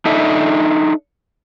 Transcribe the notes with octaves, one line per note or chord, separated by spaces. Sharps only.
D4 D#4 A4 E5